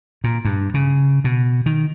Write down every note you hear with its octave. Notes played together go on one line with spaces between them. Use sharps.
A#2
G2
C#3
B2
D#3